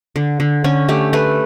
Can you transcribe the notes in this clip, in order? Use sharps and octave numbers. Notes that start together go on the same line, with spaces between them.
D3
D3
D3 C#4
A3 G4
A3 B4